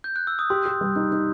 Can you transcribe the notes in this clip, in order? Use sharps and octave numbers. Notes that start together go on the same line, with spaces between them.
G6
F#6
E6
D#6
G4 C6
G4
G3
D#4
D#4